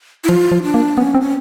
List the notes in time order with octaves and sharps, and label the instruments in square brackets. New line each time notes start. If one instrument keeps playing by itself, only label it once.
[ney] E4
[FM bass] F3 [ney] F4
[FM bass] F3
[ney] D4
[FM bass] A#3
[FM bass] B3 [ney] C#4
[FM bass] C4
[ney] C#4